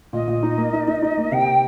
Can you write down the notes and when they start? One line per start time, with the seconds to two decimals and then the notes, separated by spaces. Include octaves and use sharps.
0.13 A#2 D#5
0.28 A#2
0.43 D#4
0.58 A#3
0.73 D#4
0.88 D#4
1.03 D#4
1.17 A#3
1.32 C3 G5